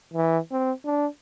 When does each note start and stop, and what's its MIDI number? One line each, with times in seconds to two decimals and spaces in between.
0.13 0.38 52
0.51 0.72 60
0.86 1.06 62